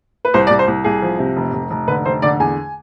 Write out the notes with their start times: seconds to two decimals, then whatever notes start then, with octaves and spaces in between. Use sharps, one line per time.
0.25 B4
0.34 C2 C5
0.47 D5
0.50 C2
0.59 C5
0.68 C2
0.84 C2 G#4
1.02 F3
1.19 C3
1.36 F1
1.53 F1
1.70 F1
1.87 D3 B4
2.05 F1 C5
2.22 D3 D5
2.40 E2 G#5